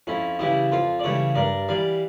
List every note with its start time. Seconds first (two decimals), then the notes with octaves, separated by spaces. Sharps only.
0.07 F2 C#4 E4
0.39 C#3 E3 G3 E4 G4
0.71 F2 F4 A4
0.99 D5
1.04 C#3 E3 G3 A4 C#5
1.36 G2 A#4 D5
1.68 E3 G3 D5 F5